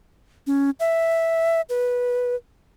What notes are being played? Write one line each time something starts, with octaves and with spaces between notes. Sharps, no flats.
C#4
E5
B4